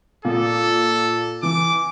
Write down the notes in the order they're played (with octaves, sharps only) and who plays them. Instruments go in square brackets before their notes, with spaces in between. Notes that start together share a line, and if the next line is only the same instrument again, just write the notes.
[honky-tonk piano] A#2 D#6 [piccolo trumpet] A4
[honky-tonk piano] E3 [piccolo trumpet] D6